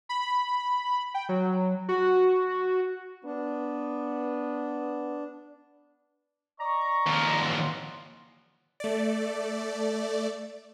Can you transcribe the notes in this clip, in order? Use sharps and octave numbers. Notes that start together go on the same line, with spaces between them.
B5
G5
F#3
F#4
B3 D4
D5 D#5 A#5 C#6
D#2 F3
A2 E3 G3 F#5 C6
A3 D5